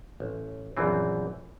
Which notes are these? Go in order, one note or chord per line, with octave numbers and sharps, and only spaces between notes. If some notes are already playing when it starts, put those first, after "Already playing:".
A1
A#1 F#2 E3 C4